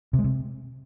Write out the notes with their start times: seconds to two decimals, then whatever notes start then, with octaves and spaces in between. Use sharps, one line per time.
0.13 C3
0.19 G#3
0.24 C3